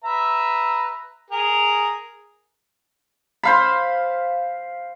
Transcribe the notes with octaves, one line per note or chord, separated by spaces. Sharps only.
B4 E5 A#5
G#4 A#4
C5 F5 B5